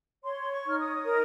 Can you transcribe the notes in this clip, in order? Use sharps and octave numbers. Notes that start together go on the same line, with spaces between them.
C#5 C6
C#6
D#4 F6
D#6
A#4